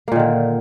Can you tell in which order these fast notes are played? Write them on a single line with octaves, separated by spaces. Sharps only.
A#3 A#2 D#3 D3